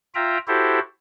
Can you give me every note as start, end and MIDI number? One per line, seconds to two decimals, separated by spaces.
0.15 0.38 65
0.15 0.38 76
0.15 0.38 79
0.15 0.38 82
0.48 0.79 64
0.48 0.79 66
0.48 0.79 67
0.48 0.79 69
0.48 0.79 72